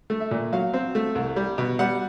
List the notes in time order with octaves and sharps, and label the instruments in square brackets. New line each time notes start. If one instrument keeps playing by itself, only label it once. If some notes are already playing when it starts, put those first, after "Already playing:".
[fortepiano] A3
E5
A#2
F#3 F5
C4
A3
C2
G3
B2
G3 F#5